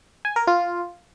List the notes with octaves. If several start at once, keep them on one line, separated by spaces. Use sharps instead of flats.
G#5
A#4
F4